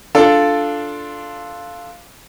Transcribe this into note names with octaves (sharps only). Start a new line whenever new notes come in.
D4 F4 A4 D5